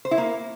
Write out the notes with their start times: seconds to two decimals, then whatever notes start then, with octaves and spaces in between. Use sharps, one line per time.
0.05 C5
0.11 E4
0.18 A#3